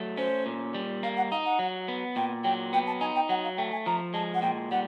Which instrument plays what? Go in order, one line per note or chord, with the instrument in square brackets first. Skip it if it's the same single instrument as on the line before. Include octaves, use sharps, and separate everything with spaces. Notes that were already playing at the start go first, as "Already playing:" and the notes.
Already playing: [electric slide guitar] F#3 A3
[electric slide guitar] C#4 [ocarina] C5
[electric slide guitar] A#2
G3
[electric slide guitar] A#3 [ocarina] F5
[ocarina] F#5
[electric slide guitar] D#4 [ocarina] F5
[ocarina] F#5
[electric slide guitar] F#3
B3
[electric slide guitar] A#2 [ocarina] G5
[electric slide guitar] F#3 [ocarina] G5
[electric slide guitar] B3 [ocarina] G5
[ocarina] A5
[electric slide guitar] D#4 [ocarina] G#5
[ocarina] G5
[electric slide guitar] F#3 [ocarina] F#5
[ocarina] F5
[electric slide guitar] A3 [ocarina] G5
[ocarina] G#5
[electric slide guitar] F3 [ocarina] A#5
[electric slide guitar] G#3 [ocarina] A5
[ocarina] F#5
[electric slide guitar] A#2 [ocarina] G5
[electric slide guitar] G3 [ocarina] F#5